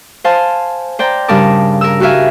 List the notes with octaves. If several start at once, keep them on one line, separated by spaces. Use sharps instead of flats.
C5 F5 G#5 A5
C5 D5 G5 A#5
G2 C#3 A#4 A5 D6
A#4 E6
F#4 G4 A#4 E5 F5 G#5